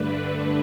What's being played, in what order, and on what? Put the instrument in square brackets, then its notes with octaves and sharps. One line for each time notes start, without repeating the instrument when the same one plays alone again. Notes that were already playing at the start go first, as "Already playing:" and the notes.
Already playing: [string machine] G2 D3 A3 D4 B4